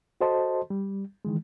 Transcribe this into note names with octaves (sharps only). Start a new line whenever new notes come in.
F#4 A4 C5 D#5 A5 C6
G3
D#3 E3 G#3